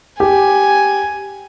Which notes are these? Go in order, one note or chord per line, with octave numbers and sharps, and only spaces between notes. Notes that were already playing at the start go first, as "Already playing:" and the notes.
G4 G#5